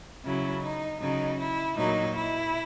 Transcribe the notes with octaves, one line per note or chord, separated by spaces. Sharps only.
C#3 F#3 E4
D#4
C#3 F#3 D#4
E4
A#2 F#3 D#4
E4